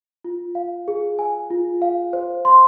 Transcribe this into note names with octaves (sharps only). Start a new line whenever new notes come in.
F4
F5
G#4
G#5
F4
F5
C5
C6